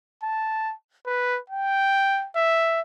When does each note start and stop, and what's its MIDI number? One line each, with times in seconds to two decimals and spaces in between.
0.23 0.73 81
1.06 1.39 71
1.50 2.27 79
2.35 2.81 76